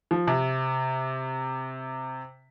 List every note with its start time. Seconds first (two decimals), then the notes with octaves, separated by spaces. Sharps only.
0.11 F3
0.27 C3